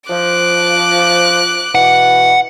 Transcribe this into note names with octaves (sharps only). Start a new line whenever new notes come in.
F3 D6 F#6
B2 E3 F#5